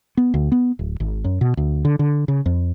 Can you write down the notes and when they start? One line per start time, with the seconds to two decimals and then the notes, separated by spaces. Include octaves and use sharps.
0.17 B3
0.34 D2
0.52 B3
0.79 D1
1.00 G#1
1.24 F#2
1.41 B2
1.57 D2
1.85 D3
1.99 D3
2.28 C#3
2.46 F2